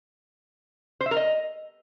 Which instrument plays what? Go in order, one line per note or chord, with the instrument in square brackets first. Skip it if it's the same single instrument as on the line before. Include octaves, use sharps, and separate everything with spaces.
[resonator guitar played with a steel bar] C5
E5
A#4
D#5